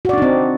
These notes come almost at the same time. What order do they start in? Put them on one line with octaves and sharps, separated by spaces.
F#4 D5 D4 D#4 C4